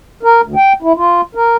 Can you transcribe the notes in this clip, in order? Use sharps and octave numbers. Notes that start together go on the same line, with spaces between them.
A#4
D2
G5
E4
F4
A#4